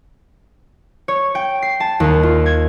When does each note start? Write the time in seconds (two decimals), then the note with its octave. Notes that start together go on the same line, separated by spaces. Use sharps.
1.08 C#5
1.35 G5
1.62 C7
1.80 A5
2.00 D#2
2.23 F4
2.46 G#6